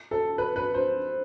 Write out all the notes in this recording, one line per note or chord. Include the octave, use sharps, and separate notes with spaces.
A4
B4
B4
C5